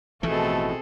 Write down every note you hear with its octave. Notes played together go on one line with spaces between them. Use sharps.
A1 B2 E3 F3 A3 C4 G#4 A4